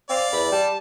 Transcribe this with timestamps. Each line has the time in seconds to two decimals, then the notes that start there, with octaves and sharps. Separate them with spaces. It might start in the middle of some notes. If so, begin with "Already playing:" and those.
0.09 C4 D5 F5
0.32 E2 B5
0.52 G3 A5